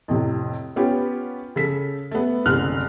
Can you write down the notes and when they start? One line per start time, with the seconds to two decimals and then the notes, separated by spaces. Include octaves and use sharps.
0.08 F2 A2 C3
0.76 B3 C#4 F4 G4
1.56 C#3 A4 B6
2.11 A3 B3
2.46 F#1 C2 D3 F6 F#6